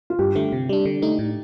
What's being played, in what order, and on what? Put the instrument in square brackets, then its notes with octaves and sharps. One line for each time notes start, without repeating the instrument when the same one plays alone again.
[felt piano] F4
[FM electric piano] G2 [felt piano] G4
[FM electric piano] D3 A3
C3
G3 D4
D3
A3 D#4
A2